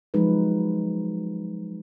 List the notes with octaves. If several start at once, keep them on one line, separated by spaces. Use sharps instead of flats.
F3 F#3 G#3 D#4 B4